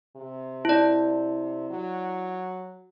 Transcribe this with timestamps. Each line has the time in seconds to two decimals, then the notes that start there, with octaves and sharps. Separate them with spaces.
0.16 C3
0.65 E4 D5
1.70 F#3